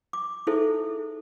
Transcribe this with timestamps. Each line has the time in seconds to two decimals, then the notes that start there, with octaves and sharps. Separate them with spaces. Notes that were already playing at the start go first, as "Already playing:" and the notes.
0.13 D6
0.47 D#4 E4 G#4 A4 C5 E5